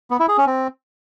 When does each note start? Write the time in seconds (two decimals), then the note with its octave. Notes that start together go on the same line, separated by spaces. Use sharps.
0.11 B3
0.20 E4
0.29 G#4
0.38 C#4
0.47 C4